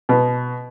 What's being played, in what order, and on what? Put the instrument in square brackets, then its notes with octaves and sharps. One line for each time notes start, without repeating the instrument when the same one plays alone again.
[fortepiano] B2